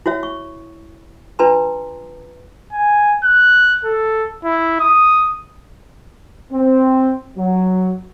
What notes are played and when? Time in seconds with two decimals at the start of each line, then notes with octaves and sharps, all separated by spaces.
0.06 E4 F#4 C#5 E5
0.23 C#6
1.39 D4 F4 B4 A5 A#5 C6
2.72 G#5
3.24 F#6
3.84 A4
4.44 E4
4.80 D#6
6.52 C4
7.36 F#3